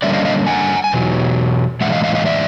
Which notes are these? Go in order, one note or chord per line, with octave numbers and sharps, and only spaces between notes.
D3 G3 A#3 C#4 D5 E5
D#5 F5
D#5 F5
F#5 G#5
G#5
E2 B2 F#3
A2 E3 G#3 E5 F#5
D#5 F5
D#5 F5
D#5 F5
D5 E5